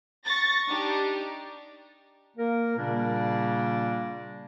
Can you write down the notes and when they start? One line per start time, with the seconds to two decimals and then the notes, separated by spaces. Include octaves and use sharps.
0.24 C#6 A6 A#6
0.69 D4 D#4 G4
2.37 A#3 A#4
2.77 A#2 C#3 G3 A#3 D4